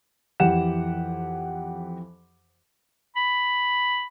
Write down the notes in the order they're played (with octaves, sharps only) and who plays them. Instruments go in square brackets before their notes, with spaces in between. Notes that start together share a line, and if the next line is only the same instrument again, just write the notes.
[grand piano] F2 E3 G4 F#5 E7
[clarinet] B5